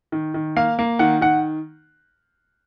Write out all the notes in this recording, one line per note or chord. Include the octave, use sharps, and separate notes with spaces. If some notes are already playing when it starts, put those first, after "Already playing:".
D#3
D#3
A#3 F5
A#3
D#3 F#5
D#3 F#5